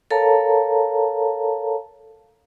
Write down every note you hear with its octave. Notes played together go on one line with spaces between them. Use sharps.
A4 A#4 C#5 F5 A5 A#5